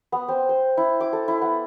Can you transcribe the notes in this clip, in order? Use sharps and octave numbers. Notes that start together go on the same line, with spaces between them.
B3
C4
C5
E4
D6
A4
E4
B3